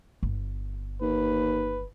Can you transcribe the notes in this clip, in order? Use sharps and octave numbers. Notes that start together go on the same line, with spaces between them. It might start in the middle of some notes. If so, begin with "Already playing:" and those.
G1
D#2 B4